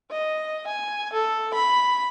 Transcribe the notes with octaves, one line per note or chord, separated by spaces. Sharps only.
D#5
G#5
A4
B5